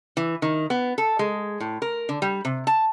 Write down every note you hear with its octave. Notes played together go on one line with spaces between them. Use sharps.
E3
D#3
B3
A4
G#3
A2
A#4
D3
G3
C3
A5